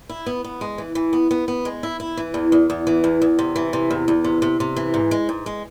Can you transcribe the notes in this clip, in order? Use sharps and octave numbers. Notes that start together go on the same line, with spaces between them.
E4
B3
B3
G#3
E3
E3
B3
B3
B3
G#3
E4
E4
E3
E2
E2
E2
E3
E2
E2
C3
E3
C3
E2
E2
C3
C3
C3
E3
G#2
G#3
G#2
G#3